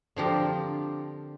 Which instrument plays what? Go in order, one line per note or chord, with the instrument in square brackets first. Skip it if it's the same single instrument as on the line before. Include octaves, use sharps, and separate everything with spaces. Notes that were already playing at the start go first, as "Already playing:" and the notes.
[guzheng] D3 F3 C4 G4 A#4